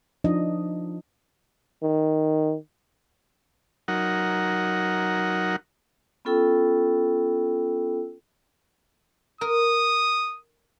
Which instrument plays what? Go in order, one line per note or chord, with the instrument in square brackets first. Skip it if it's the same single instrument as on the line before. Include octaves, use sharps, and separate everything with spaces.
[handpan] F3 D4 D#4 D#5
[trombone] D#3
[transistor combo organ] F#3 D#4 A#4 F#5
[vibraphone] B3 C#4 F4 A4 G5 E6
[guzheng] A#4 [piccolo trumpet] D#6